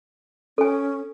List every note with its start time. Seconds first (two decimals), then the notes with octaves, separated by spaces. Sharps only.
0.58 C#4 A4 G#5